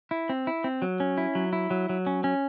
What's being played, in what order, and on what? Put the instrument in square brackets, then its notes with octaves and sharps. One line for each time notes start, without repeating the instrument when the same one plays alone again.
[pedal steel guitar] E4
C4
E4
C4
F#3
C#4
E4
F#3
E4
F#3
F#3
C#4
C#4